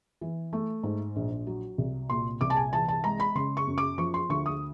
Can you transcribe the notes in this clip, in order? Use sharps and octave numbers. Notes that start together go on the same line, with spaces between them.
E3
A3
G#2
A#1
F#3
C2
A#2 C6
C2 D6
A5
G#5
E3 A5
A5
G#3 A#5
B5
C#3 C6
C#6
F#2
D6
F3 C#6
C6
D2 C#6
D#6